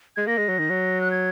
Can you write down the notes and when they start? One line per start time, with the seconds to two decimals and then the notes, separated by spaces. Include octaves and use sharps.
0.16 G#3 G#6
0.27 A#3 A#6
0.38 G#3
0.49 F#3
0.59 D#3
0.70 F#3
1.01 F#6
1.11 G#6